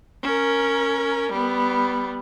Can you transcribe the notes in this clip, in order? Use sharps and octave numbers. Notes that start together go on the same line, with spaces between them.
C#4 A#4
G3 B3